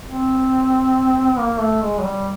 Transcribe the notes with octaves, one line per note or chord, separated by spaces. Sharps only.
C4
A#3
A3
G#3
F#3
G3